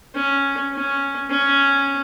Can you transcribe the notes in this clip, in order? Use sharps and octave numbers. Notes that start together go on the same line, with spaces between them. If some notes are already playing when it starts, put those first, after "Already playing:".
C#4
C#4
C#4